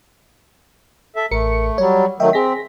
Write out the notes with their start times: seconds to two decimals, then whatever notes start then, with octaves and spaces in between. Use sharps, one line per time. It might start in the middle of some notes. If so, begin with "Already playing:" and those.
1.16 A4 E5
1.31 A1 A3 A#4 C#7
1.78 F#3 G3 C#5
2.20 D#3 F#3 A3 D#5 E5 G5
2.33 C4 G#4 A#6 B6